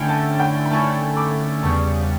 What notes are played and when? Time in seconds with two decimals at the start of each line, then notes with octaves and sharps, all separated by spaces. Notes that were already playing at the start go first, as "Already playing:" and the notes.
Already playing: D3 A3 C#4 E4 G5 B5
0.09 F#5 A5
0.40 G5 B5
0.65 B5
0.70 D3 A3 C#4 E4 A5 C#6
1.17 B5 D6
1.63 E2 C#3 G3 B3 A5 C#6